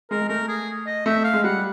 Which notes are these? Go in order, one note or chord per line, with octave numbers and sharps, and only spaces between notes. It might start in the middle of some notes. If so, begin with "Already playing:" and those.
G#3 A#4
G#3
A3 A#4
G#4
D#5
A3 E5
F5
G#3
G3 F#5